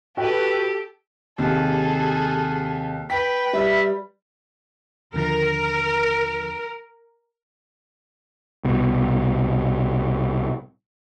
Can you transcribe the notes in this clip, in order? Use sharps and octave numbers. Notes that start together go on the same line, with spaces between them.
F#4 G4 A4 B4 G5
D#2 C3 G#4 A4
B4 G5 B6
G3 E5
D#2 D3 F3 A#4
C2 B2